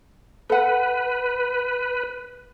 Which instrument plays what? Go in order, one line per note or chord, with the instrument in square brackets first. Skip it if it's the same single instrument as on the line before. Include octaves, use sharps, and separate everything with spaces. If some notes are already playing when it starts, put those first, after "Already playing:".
[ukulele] A4 F#5 [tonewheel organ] B4